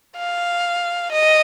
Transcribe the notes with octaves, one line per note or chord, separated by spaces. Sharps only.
F5
D#5